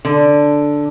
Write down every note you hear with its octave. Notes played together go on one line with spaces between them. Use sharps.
D3